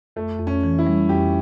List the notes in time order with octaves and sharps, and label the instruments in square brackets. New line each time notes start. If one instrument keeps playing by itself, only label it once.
[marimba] F2 [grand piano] A3
[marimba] F2
[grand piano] C#4
[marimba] E3
[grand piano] E4
[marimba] G3
[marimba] F2 [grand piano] G4